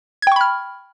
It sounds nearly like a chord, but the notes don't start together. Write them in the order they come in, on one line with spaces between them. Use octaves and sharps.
G#6 G5 C#6 B5 F6